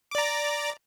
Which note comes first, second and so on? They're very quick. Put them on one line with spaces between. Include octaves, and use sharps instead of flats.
D6 D5 A#5